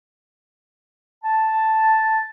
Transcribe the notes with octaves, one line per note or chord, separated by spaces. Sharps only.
A5